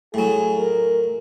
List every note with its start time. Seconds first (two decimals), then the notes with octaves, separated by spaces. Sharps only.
0.14 A2 F#3 G#4
0.57 A#4